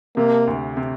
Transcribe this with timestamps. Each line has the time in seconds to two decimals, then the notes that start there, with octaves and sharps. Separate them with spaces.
0.17 C3 A#3
0.47 D2
0.77 C3